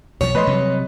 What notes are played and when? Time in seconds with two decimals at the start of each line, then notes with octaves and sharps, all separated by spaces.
0.21 B1 F3 C#5
0.35 F3 A3 B4 D#5 C6
0.47 C3 F#3 G3